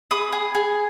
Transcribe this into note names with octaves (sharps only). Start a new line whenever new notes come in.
G#4 B5 D#6
G#4
G#4